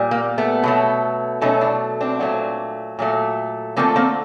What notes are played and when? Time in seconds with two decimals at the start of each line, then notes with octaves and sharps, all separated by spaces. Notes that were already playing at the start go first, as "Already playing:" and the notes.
Already playing: A#2 G3
0.11 A#3
0.38 A3 B3
0.63 B2 F#3 A3
1.41 B2 F#3 A3 C#4 D#4
1.61 D4 E4
2.01 C4 D4
2.20 A#2 F#3 A3
2.99 A#2 F#3 A3
3.76 D3 F3 A3 A#3 C4
3.96 A#3 C4